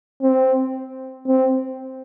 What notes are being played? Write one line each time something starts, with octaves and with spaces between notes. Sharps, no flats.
C4
C4